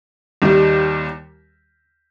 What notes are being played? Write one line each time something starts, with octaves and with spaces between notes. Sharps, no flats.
D#2 D#3 G3